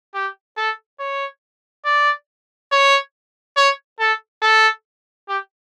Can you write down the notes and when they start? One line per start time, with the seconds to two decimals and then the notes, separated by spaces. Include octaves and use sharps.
0.14 G4
0.57 A4
0.99 C#5
1.85 D5
2.72 C#5
3.57 C#5
4.00 A4
4.42 A4
5.29 G4